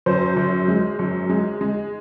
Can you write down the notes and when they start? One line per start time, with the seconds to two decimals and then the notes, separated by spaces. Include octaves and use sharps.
0.06 F#2 C5
0.37 F#2
0.68 G#3
0.99 F#2
1.29 G#3
1.61 G#3